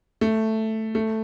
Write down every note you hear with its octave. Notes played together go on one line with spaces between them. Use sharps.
A3
A3